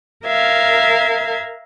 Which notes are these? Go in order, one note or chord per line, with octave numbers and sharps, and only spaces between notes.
A#4 E5 F5 G#6